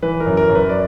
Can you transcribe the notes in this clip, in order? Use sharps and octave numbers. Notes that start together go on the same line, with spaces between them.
E3 B4
A#4
F#2
A#4
F#2
B4
D5